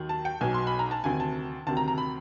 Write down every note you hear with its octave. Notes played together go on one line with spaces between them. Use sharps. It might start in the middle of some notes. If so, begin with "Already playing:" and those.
Already playing: D#2 D#3 F#3
A5
G5
B1 B2 F#3 G#5
C6
B5
A#5
A5
D2 C3 D#3 F#3 G#5
A5
D2 C3 D#3 F#3 A5
A#5
A#5
B5